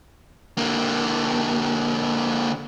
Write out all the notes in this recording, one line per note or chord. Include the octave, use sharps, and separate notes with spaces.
D3 A#3